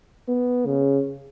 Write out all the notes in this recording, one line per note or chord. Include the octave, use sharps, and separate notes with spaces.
B3
C#3